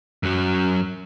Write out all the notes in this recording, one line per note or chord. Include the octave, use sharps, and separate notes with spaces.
F#2 F#3